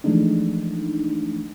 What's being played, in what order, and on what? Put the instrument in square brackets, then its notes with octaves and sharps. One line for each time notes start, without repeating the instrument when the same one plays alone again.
[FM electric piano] E3 F3 G#3 A3 D4 D#4